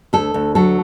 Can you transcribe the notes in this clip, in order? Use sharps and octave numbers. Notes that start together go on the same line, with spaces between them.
D2 A4
D2
F#3 A4